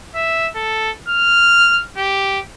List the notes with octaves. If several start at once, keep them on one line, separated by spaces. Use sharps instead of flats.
E5
A4
F6
G4